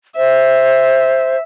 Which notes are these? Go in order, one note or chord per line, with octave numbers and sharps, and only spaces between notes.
C5 E5